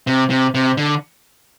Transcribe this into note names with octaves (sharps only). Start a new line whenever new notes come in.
C3
C3
C3
D3